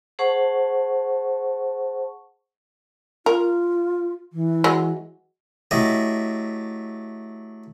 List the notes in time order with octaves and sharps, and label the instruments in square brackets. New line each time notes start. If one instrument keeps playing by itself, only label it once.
[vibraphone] G#4 C5 F#5 A5 C#6
[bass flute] F4 [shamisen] A#4
[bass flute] E3
[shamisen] F#3 G#3
[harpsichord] F#3 A3 E4 G4 D#5